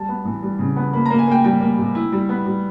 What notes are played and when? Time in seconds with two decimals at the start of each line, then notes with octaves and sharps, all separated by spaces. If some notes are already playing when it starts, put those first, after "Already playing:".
Already playing: G3 A5
0.09 B3
0.25 E3
0.43 G3
0.59 C#3
0.76 B3
0.93 A#3 B5
1.06 A#3 A#5
1.19 G#5
1.27 A#3 G5
1.44 G3 G5
1.61 A#3
1.78 C3
1.95 E4
2.12 G3
2.29 B3
2.46 G3